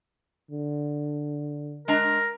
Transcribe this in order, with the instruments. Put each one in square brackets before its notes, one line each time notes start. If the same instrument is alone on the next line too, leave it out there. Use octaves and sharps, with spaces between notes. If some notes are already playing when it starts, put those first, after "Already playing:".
[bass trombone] D3
[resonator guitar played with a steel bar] G#3 D4 A#5 [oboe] A#4